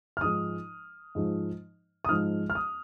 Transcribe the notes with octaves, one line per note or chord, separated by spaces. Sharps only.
F6
G#2 F3 G#3 D#4 D#6
G#2 F3 G#3 D#4
D#6
G#2 F3 G#3 D#4 F6
F6
D#6